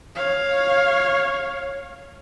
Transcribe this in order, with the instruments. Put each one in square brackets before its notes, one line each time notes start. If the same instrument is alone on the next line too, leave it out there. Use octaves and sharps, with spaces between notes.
[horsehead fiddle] C#5 F5